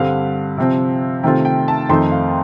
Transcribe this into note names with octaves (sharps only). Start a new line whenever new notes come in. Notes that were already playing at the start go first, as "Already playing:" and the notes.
Already playing: G2 D3 G3 C4 F5
C3 F3 C4
C3 D#3 A3 C4 F4 G5
G5
A5
F2 D#3 A3 C4 D#4 C6
F5